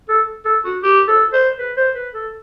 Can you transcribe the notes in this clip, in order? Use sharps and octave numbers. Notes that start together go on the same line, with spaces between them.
A4
A4
F#4
G4
A4
C5
B4
C5
B4
A4